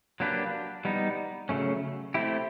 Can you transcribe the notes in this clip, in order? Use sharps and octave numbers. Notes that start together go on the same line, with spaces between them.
F#3 A#3 D4 G4 B4
G3 B3 D#4
C#3 F#3 A3 C#4
A3 C4 E4 G4